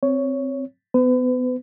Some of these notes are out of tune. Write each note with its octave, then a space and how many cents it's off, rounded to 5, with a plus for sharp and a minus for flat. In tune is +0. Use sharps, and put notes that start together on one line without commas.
C4 +0 C#5 +10
B3 +25 B4 +40